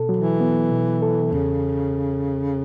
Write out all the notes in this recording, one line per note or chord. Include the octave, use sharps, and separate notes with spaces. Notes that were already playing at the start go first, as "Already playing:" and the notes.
Already playing: B2 A4
F#3
E3
B3
B2
A4
E2 C#3